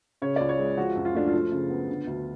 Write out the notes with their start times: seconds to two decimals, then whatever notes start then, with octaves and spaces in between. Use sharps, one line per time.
0.22 C#3 C#5
0.36 C#2 D5
0.49 C#5
0.59 G#3
0.77 F3 F#4
0.96 F#2
1.05 F4
1.15 A3 D4
1.28 F4
1.33 F3
1.52 C#3
1.70 B3
1.89 D3
2.07 D2